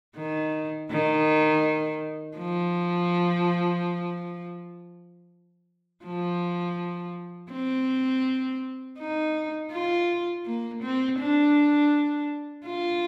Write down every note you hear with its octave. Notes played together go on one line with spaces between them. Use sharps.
D#3
D#3
F3
F3
C4
D#4
F4
A#3
C4
D4
F4